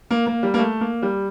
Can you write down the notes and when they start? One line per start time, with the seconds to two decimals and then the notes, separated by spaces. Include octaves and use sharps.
0.11 A#3
0.27 A#3
0.43 G3
0.54 A#3
0.58 A3
0.81 A#3
1.02 G3